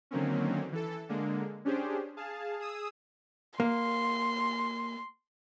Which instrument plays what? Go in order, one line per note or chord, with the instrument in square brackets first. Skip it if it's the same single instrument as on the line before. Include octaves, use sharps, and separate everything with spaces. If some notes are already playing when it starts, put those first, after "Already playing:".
[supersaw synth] D3 D#3 F#3 A#3 C4 C#4
E3 A4
D3 G#3 A#3
C#4 D4 G4 G#4 C5
G#4 F5 A5
G#4 D#6 E6
[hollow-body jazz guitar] A#3 [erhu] C6